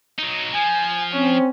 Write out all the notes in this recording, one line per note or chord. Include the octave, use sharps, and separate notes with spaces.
F#3 D#4
F3 G#5
C4 C#4